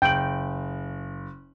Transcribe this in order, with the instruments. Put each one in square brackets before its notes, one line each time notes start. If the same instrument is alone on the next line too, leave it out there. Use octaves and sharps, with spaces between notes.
[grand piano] F#1 F#7 [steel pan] G5